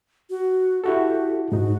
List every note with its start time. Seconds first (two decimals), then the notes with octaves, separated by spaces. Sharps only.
0.30 F#4
0.84 E4 F#4 G4 A4
1.52 G#2 D#4 F#4